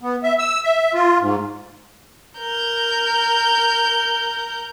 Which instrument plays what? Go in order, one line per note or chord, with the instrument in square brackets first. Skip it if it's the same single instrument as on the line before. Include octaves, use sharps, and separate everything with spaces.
[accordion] B3
E5
E6
E5
F4
G#2
[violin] A#4 G6